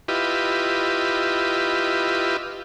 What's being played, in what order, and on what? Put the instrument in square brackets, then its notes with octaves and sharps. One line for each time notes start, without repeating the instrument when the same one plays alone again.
[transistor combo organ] E4 F4 G4 B4 D#5